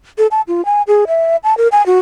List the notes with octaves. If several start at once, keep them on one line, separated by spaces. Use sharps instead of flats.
A4
A5
F4
G#5
G#4
E5
A5
A#4
G#5
F#4